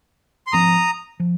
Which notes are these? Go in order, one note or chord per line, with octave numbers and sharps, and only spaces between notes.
C6
G#1 G#2 F3 C4 A#5 D#6
F3